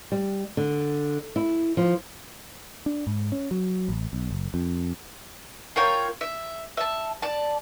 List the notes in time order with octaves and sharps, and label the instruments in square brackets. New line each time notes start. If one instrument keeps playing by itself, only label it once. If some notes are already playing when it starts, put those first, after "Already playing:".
[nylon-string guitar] G3
D3
E4
F3
[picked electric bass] D4
G#2
C#4
F#3
A1
B1
F#1
F2
[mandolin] F4 A#4 C#5 G5
E5
E5 A5
D5 A5